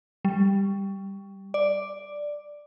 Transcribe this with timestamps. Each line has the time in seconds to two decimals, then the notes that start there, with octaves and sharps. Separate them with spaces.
0.25 G3
1.54 D5